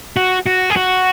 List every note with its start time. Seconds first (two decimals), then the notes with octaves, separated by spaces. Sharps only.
0.17 F#4
0.46 F#4
0.70 G#4
0.77 F#4